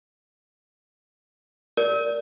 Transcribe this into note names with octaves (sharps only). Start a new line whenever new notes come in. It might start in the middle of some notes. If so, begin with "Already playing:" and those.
A#4 D5